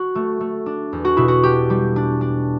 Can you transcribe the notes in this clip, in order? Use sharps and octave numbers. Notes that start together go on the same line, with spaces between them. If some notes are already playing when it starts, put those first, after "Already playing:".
Already playing: F#4
A3
A3
D4
E2
F#4
B2 E4
F#4
D4 G4
G3
D4
D4